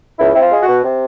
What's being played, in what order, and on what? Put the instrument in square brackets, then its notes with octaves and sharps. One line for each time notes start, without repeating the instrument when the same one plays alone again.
[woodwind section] C#2 E4
C4 E4
F4
G#3
F#4
B2
C3